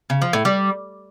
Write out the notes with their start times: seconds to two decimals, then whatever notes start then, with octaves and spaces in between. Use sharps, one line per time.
0.10 C#3
0.22 F3
0.33 A2
0.45 G3